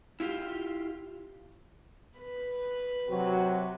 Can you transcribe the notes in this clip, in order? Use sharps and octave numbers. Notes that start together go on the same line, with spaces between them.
E4 F4 G4
B4
C3 F#3 F#4